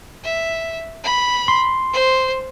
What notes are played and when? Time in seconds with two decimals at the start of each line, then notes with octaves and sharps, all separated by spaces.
0.24 E5
1.04 B5
1.48 C6
1.93 C5